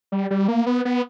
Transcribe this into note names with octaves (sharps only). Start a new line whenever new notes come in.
G3
G3
A#3
B3
B3